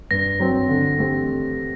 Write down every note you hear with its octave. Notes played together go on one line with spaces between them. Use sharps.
G2 A#6
F#3 C4
D3
A3 C4 G4